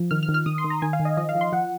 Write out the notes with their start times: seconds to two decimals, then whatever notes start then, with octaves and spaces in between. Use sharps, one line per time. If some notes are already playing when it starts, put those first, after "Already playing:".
Already playing: F3
0.11 D#3 F6
0.23 F6
0.29 D#3
0.34 F6
0.46 D#3 D#6
0.58 C6
0.64 D#3
0.70 A#5
0.82 D#3 G#5
0.93 F5
1.00 D#3
1.05 D#5
1.17 F3 D#5
1.29 F5
1.35 F3
1.41 C6
1.52 F3 F#5